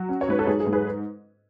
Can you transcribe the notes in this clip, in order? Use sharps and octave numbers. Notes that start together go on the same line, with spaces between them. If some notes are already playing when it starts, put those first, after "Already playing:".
Already playing: F#3 F#4
C#4
C#5
G#2 B4
A4
G#2 G#4
G#4
G#2
G#4 B4